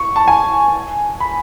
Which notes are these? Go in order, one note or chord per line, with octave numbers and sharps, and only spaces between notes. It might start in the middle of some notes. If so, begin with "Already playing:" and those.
Already playing: C#6
A5
G#5
B5